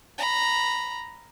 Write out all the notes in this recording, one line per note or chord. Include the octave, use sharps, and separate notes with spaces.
A#5 B5